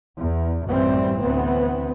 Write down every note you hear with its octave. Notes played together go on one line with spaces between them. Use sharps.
E2
A1 F#2 E3 G3 C4
D2 E3 B3 C4